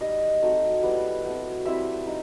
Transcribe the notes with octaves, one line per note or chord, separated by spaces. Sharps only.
G3 D#4 D#5
F#3 A3 C4 D#4
G3 B3 E4
F#3 A3 C4
G3 C4 E4 E5
D#4